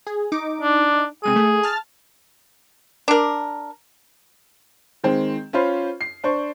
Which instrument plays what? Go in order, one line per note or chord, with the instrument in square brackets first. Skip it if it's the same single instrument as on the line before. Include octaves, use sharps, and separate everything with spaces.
[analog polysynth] G#4
D#4 D6
[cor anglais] D4
[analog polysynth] C3 G#3 D#7 [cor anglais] G#4
[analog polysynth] A3
A5 F6 A6
[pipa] D4 A#4
[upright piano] D#3 G#3 C4
C#4 F4 C5 B5
C7
D4 C5 C#6